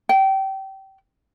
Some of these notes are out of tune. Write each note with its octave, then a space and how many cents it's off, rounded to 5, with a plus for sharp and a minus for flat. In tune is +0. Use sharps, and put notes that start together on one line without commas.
G5 -25